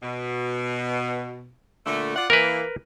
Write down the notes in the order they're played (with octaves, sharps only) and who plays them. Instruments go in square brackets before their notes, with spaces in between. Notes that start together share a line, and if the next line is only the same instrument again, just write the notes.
[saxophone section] B2
A#2 D3 A3
F4 D5 F#5
[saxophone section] E3 A#3 [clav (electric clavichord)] A#4 B4